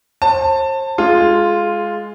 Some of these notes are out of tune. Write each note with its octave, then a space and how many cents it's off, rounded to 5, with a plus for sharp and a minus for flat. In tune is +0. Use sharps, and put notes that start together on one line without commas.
C5 +40 A5 +20
G#3 +0 F4 +0 G#4 +30